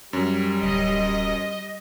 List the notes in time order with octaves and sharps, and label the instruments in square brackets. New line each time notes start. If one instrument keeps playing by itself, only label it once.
[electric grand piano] F#2 C#4 [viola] G3
[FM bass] D1 [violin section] D#5